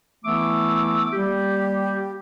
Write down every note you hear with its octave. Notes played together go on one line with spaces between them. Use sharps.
E3 A3 B3 E4 D6 E6
G3 A#3 G4